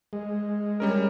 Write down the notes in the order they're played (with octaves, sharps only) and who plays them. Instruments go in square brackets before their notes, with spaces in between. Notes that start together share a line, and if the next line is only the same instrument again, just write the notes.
[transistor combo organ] G#3
[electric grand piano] G3 C#4 A#4